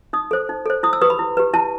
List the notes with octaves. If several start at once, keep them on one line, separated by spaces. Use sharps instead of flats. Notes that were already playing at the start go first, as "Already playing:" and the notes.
D#4 D#6
A4 C5
D#4
A4 C5
E4 D#6
E6
G4 B4 D#6
B5
E4
G4 B4
E4 A5